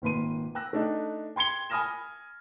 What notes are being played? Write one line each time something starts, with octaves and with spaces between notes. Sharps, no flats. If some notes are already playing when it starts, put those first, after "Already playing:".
G#1 A#2 B4 C6 D#7
G5 E6 F#6 A#6
A3 D4 D#4
G5 C6 G#6 C#7 G7
G#5 B5 D#6 F6 A#6 E7